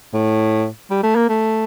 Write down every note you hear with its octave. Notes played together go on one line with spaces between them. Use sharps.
A2
G3
A3
A#3
A3